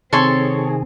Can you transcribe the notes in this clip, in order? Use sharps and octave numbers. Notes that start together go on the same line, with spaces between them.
C3 D#3 C4 G#4 A4 C#5 C6